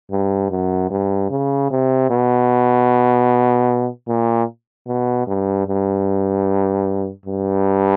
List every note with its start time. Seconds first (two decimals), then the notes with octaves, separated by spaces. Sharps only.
0.11 G2
0.51 F#2
0.90 G2
1.31 C#3
1.71 C3
2.10 B2
4.08 A#2
4.87 B2
5.27 G2
5.67 G2
7.26 G2